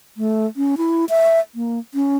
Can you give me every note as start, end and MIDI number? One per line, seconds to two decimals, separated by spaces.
0.17 0.46 57
0.56 0.76 61
0.78 1.05 64
1.09 1.40 76
1.55 1.79 58
1.94 2.17 61